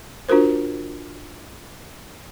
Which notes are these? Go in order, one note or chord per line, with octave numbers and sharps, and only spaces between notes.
D4 F4 F#4 A#4 C5